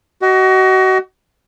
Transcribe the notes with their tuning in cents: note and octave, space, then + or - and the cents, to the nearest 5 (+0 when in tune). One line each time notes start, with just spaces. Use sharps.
F#4 +30 D#5 +0